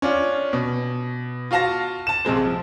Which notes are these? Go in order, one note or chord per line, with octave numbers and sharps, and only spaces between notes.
C#4 D4 F4
B2
F4 F#4 F5 A5 A#6
A5 E7
A#1 C3 G#3 C5
F3